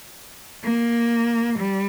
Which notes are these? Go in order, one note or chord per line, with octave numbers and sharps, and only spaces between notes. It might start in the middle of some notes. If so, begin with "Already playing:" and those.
A#3
G3